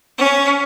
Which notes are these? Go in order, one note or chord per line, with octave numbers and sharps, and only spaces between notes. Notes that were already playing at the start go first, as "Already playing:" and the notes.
C#4